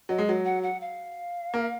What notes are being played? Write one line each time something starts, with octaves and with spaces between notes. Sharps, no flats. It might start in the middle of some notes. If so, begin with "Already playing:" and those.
F#3 D#5
G#3
F#3
F#5
F#5
F5
A#3